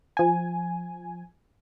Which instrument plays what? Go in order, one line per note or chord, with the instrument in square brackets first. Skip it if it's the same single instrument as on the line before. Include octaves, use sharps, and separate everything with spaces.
[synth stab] F3 G#5